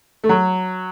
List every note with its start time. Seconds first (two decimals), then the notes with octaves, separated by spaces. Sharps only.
0.24 A3
0.29 F#3